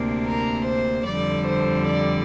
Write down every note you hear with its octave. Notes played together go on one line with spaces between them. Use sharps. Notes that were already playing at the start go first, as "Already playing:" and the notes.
Already playing: D2 C3 A#3 D4
A#4
C5
F2 D3 G3 D5
C5
D5